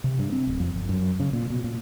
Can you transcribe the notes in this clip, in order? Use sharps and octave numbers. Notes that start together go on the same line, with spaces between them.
C3
G2
C4
D1
F2
G1
F#2
C#3
A#2
B2
A#2